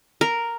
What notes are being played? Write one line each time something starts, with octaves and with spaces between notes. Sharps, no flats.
A#4